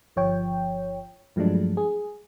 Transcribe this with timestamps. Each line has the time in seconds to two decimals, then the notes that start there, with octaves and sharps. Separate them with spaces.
0.16 G1 F3 C#5 G5
1.36 G2 F3 F#3 G#3 A3 D4
1.77 G#4